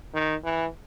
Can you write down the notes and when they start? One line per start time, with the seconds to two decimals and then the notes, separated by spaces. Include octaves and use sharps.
0.14 D#3
0.44 E3